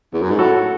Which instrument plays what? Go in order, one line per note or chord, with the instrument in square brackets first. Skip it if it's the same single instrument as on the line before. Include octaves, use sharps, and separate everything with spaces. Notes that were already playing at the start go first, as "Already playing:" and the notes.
[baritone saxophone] E2
F#2
G#2
[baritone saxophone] A2 [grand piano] F#4 A4